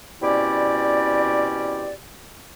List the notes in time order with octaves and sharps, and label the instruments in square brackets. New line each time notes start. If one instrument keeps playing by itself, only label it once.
[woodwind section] B2 C4 C#4 E4 G4 D5